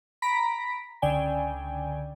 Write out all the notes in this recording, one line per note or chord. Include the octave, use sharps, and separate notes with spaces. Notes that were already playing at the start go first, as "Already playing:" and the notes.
A#5 B5 A#6 B6 D7
C#2 D3 D5 G5 G#5